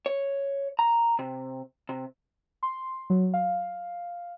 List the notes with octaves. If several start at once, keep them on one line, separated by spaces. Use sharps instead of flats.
C#5
A#5
C3
C3
C6
F#3
F5